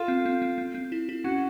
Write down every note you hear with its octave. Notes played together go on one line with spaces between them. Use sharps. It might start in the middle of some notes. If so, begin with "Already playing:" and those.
Already playing: F4 A4
C4
C4
C4
C4
C4
E4
E4
C#4 F#4